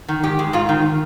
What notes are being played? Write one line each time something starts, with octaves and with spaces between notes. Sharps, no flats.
D#3
G#2 G4
G#3
G#2 F4
D#3